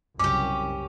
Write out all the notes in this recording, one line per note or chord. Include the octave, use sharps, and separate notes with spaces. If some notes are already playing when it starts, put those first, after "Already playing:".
F#1 C2 F#2 C#4 G4 D6